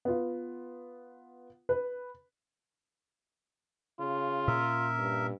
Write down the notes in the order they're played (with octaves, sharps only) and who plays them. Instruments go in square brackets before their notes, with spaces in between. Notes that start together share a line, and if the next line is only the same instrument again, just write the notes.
[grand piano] B3 F4
B4
[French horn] C#3 [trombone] F4
[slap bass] A#2 C#4 [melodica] A#4 E5
[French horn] G2